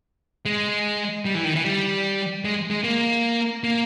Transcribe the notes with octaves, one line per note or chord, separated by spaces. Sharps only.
G#3
G3
E3
D#3
E3
G3
G#3
G#3
A#3
A#3